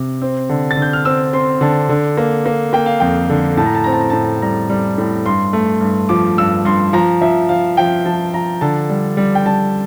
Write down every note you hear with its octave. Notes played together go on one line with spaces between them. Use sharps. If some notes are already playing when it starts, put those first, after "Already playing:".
Already playing: C3
C4
D3
A6
D3
G6
F6
C4 E6
C4 C6
D3 A5
D3
A#3
A#3
A#3 G5
F5
F2 G5
D3
A2 A5
A#5
A5
C4 A#5
A5
A#5
A2 A5
G3 A#5
G3
A2
G2 C6
A3
G2
F3 D6
G2 E6
G2 C6
F3 A#5
F3 E5
F3 F5
F3 G5
F3 A5
F3 A#5
D3 A5
G3
G3
G5
G3 A5